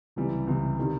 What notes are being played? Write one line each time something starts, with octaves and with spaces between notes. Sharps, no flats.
C#2 C3 E3 G3
C#2 C3 E3 G3
C3 D#3 G3